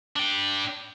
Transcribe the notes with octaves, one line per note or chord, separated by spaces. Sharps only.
D4 G5